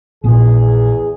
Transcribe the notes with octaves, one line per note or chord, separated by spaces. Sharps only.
A#1 E2 A#2 B3 G#4